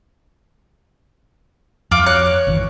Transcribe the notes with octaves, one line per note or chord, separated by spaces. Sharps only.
F2 F4 F#5 D6
F#4 C#5 F#6
G#1 B2 E3